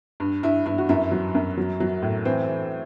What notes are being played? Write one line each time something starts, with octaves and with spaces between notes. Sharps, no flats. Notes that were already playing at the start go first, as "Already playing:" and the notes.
G2
G2 E4
G2 E4
F#4
F#2 E4
F#3
F#2
F#3
F#3
A2
E3 C4
E3